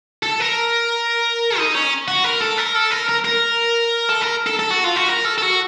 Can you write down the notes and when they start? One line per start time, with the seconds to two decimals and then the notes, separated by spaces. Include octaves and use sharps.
0.23 A4
0.40 A#4
1.58 D#4
1.75 C#4
2.08 F#4
2.24 A#4
2.41 A4
2.57 A#4
2.75 A4
2.91 A#4
3.08 A#4
3.24 A#4
4.09 A4
4.21 A#4
4.46 A4
4.59 A4
4.71 F#4
4.84 F4
4.96 F#4
5.09 A#4
5.25 A4
5.38 A4
5.42 F#4